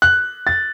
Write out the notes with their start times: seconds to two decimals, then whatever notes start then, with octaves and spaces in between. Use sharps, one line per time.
0.02 F#6
0.47 A6